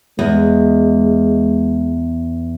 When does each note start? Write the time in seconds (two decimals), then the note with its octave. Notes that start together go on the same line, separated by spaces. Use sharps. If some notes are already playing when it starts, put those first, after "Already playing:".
0.19 E2 G#3